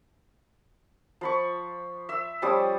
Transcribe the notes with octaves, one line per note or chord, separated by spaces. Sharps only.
F3 B5 C#6
E5 E6
F3 G3 C#4 D#6